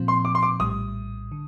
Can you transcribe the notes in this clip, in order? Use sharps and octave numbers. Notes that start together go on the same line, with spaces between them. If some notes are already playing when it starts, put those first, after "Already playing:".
Already playing: A#2 F3 C4
C6
D6
C6
D6
A#1 A2 G3 D#6
D3